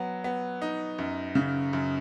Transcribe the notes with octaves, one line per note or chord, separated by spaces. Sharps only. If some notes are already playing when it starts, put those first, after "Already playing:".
Already playing: F#3 B3
B3
D#4
F#2
C#3
F#2